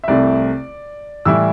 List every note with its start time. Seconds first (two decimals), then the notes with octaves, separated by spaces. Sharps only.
0.04 E5
0.08 C2 C3 A3 E4 D5
1.25 A2 E3 G3 E4 E6